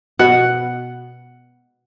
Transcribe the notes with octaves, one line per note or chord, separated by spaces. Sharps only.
B2 F#5